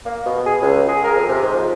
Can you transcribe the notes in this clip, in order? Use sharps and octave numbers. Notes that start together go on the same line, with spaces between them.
A#3
B2
G#4
C#2
G#4
A#4
F2
C3
G#2
F3